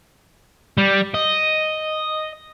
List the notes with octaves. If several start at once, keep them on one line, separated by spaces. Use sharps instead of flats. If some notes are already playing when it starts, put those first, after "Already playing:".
G3
D#5